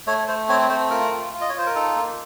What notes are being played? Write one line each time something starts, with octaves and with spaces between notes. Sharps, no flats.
A3 C#5
A3 C5
C4 C#5
A3 C5
F4 A#4
F4
F4
D#5
C#5
F4 C5
A#4
D#4 A4
A#3